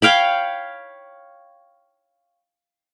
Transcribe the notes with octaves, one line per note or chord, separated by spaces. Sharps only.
C#5 F5 G5 B5